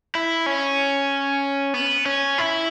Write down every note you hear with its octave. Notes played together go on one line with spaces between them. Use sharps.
E4
C#4
B3
C#4
E4